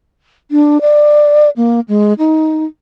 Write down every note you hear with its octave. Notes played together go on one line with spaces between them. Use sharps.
D4
D5
A#3
G#3
D#4